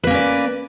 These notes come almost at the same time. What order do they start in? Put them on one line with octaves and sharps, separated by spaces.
B4 A#3 C#4 D5